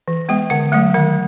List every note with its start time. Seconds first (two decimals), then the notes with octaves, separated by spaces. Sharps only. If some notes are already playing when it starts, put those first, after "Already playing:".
0.08 E3
0.29 G#3 B3 G5
0.50 D3 F#5
0.72 F#3 A3 F#5
0.94 D#3 F#5